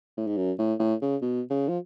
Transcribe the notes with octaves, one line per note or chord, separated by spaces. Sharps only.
A2
G#2
F#2
A2
A2
C#3
B2
C#3
F3